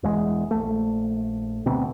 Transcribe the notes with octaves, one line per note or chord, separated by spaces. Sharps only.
E1 E2 G#3
A#1 A3
D2 B2 C4